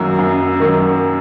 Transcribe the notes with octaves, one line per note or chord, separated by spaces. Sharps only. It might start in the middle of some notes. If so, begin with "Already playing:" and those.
Already playing: F#2 D#3 F#3 A#3
F#2
D#3 F#3 A#3